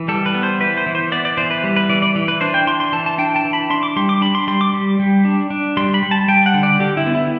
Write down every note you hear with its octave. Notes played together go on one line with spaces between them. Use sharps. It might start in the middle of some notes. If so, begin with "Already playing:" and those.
Already playing: E3
G3 A4
B4
B3
C5
E3 B4
C5
E3
C5
B3 D5
D5
E3 C5
B4
G3
B4
E3 D5
D5
E3
B4
D4 C5
G5
E3 C6
C6
E3 A5
A5
D4 G5
A5
E3
B5
D4 C6
D6
G3 C6
D6
D4 B5
C6
G3 C6
D6
G3
G3
D4
D4
G3 C6
B5
G3
A5
G3 G5
F#5
D3
D5
D3 G4
E4
B3
E4